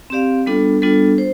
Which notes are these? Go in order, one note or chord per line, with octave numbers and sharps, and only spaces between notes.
C4 G4 D5 F5
G3 B3 D4 F4 A4
G3 B3 D4 F4 A4
C5